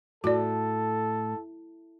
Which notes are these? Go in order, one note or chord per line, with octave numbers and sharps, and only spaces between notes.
A2 F#4 A4 D5